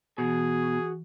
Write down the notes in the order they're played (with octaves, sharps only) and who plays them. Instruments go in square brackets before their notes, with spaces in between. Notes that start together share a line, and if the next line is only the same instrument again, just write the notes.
[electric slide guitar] B2 [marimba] E3 [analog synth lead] F#4 [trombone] G#4